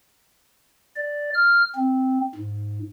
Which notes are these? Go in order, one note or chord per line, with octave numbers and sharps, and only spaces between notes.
D5
F6
C4
G#2